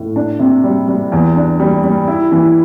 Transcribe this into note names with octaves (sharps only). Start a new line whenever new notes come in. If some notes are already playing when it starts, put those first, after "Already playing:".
Already playing: A2
D4
C3
G3
G3
E2
D4
G3
G3
E4
E3